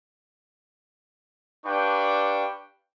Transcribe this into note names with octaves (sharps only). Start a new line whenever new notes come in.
D4 G4 B4 F5 G5 C#6